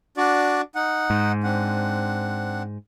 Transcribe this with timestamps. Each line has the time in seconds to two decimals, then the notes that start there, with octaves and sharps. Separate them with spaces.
0.17 D4 F#4 D5
0.75 D#4 F#5
1.10 G#2
1.44 C4 D4 F#5